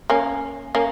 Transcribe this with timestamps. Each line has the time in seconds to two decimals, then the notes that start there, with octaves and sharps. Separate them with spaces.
0.10 A#3 C#4
0.75 A#3 C#4